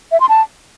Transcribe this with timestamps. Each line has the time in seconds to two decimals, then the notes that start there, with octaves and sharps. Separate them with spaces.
0.12 E5
0.20 C6
0.29 A5